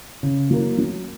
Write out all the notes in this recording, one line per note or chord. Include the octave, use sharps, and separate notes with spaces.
C#3
F#3 A#3 E4 A#4
F#3